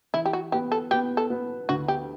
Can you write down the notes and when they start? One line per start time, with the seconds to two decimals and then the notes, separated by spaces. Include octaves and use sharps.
0.14 E3 E4
0.26 G4
0.33 F#4
0.52 B3 G4
0.72 A4
0.91 B3 G4
1.17 A4
1.30 B3
1.69 D2 F#4
1.88 G4